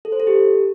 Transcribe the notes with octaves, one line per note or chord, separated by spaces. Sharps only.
A4
C5
A4
G4